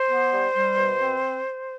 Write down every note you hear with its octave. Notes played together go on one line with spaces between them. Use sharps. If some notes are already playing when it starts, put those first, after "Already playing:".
Already playing: C5
B3
G3
G3
B2
C4